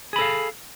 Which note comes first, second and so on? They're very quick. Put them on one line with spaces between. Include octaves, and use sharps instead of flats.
G#4 B5 A4 F5